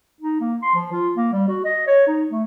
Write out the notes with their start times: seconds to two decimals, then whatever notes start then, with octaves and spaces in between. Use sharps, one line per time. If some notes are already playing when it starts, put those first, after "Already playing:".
0.20 D#4
0.40 A#3
0.62 C6
0.75 F3
0.92 F4
1.17 A#3
1.33 G3
1.48 F#4
1.64 D#5
1.87 C#5
2.07 D#4
2.31 A3